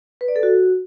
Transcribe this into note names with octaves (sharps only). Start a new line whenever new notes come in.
B4
D5
A4
F#4